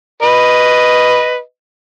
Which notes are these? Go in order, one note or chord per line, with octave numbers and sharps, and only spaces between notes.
B4 D#5